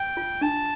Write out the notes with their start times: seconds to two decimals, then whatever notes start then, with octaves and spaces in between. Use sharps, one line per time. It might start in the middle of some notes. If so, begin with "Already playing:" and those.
Already playing: G5
0.17 F4
0.41 D4 A5